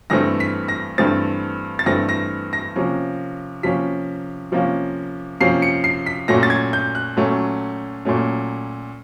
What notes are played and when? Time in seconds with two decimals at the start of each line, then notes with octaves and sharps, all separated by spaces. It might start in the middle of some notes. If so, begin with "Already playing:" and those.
0.10 G2 E3 A3 C4 A#6
0.40 B6
0.68 A#6
0.98 G2 E3 A3 C4 A6
1.79 A6
1.86 G2 E3 A3 C4 A#6
2.09 A#6
2.53 A#6
2.76 C3 F3 A#3 C#4
3.63 C3 F3 A#3 C#4 B6
4.52 C3 F3 A#3 C#4
5.40 C3 F3 A#3 C#4 C7
5.62 C#7
5.84 C7
6.06 B6
6.28 A#2 F#3 A3 C#4 A#6
6.43 A6
6.50 G#6
6.73 G6
6.95 F#6
7.17 A#2 F#3 A3 C#4
8.05 A#2 F#3 A3 C#4